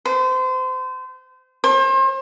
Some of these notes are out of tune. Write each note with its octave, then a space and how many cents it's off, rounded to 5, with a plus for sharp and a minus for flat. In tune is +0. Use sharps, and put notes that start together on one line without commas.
C5 -30
C5 +35